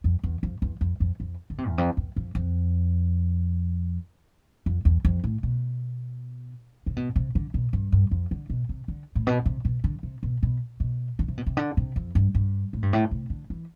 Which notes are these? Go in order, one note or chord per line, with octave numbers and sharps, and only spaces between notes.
F2
E2
F2
E2
F2
F2
F2
D3
C3
E2
F2
E2
F2
F2
F2
E2
F2
A2
B2
C3
B2
C3
D3
B2
G2
G2
F2
D3
B2
C3
D3
A2
B2
C3
B2
D3
C3
B2
B2
B2
D3
C3
B2
C3
D3
C3
F2
G2
G2
A2
G2
A2
C3
D3
E3